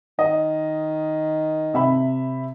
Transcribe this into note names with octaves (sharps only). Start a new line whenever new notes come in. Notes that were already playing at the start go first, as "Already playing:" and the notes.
D#3 D#5
C3 E5 B5